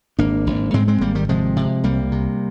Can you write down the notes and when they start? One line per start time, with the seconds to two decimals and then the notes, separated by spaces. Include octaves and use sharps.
0.19 G#1 A#3 D4
0.47 G#1
0.74 G#2 G#3 C4
0.88 G#3 C4
1.01 G#1 G3 A#3
1.15 D#3 G3
1.29 C3 F3 G#3
1.56 C3
1.84 C2 G3 A#3
2.12 C3